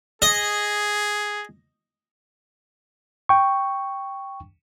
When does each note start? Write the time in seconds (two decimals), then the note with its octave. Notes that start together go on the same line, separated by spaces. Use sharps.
0.22 G#4 D#5
3.29 G5 C#6